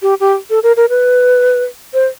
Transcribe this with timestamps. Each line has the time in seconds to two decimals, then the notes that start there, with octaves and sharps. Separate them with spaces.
0.02 G4
0.20 G4
0.50 A4
0.63 A#4
0.77 A#4
0.89 B4
1.94 C5